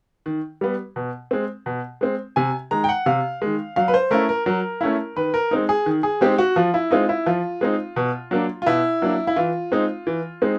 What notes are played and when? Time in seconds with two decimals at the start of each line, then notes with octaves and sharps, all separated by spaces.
0.26 D#3
0.61 G3 B3
0.96 B2
1.31 G#3 C4
1.66 B2
2.01 G#3 C4
2.36 C3 G#5
2.71 D#3 G#3 A#5
2.84 G5
2.89 F#5
3.06 C3 F5
3.42 D#3 G#3
3.76 F#3 F5
3.88 B4
3.94 C5
4.11 A3 C#4 E4 A#4
4.29 A#4
4.46 F#3 A#4
4.81 A3 C#4 E4
5.16 D#3 B4
5.34 A#4
5.51 G#3 C4 D#4
5.69 G#4
5.86 D#3
6.03 G#4
6.21 G#3 C4 D#4 G4
6.38 F#4
6.56 F3 F4
6.74 E4
6.91 G#3 C4 D#4 F4
7.09 E4
7.26 F3 F4
7.61 G#3 C4 D#4
7.96 B2
8.31 F#3 A#3 D4
8.62 F4
8.66 B2 E4
9.02 F#3 A#3 D4
9.27 E4
9.36 E3 F4
9.72 G#3 C4 D#4
10.07 E3
10.42 G#3 C4 D#4